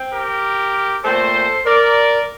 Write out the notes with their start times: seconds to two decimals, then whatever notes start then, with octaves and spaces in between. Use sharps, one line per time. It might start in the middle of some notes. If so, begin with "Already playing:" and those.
Already playing: C4
0.13 G4 A#4
1.04 A#2 A3 C4 A4 C5
1.66 A#4 D5